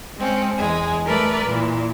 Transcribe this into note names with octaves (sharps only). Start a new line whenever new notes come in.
G#3 C4 C#4
E2 G#3 G#5
A3 A#4 B4 D5
A#2 E3